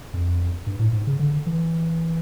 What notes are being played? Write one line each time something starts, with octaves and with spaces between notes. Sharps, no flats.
F2
G2
A2
G#2
C#3
D3
E3